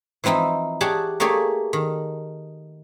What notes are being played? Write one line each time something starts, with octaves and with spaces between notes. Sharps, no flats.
E3 F3 C4 D#4 E4
G4 G#4 C#5 D5 F#5 A5
A3 A#3 G4 G#4 C#5 D5
D#3